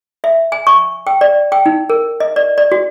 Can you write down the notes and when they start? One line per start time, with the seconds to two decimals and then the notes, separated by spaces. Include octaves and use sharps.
0.24 E5
0.52 G#5
0.67 C#6
1.07 G5
1.21 D5
1.52 G5
1.66 D#4
1.90 A#4
2.20 D#5
2.36 D5
2.58 D5
2.72 F#4